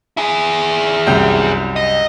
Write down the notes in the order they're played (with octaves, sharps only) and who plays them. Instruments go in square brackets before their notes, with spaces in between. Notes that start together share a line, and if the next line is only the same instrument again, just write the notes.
[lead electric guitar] E4 G#4
[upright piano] C2 F#2 G5
[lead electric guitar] D#5